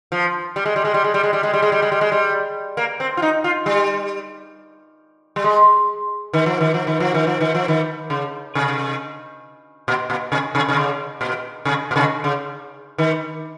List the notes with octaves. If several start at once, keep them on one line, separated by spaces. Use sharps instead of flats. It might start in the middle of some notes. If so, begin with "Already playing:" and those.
F3
G3
G#3
G3
G#3
G3
G#3
G3
G#3
G3
G#3
G3
G#3
G3
G#3
G3
G#3
G3
A#3
C4
F4
D#4
F4
G3
G3
G#3
D#3
F3
D#3
F3
D#3
F3
D#3
F3
D#3
F3
D#3
C#3
C3
A#2
A#2
C3
C3
C3
C#3
A#2
C3
A#2
C3
C#3
D#3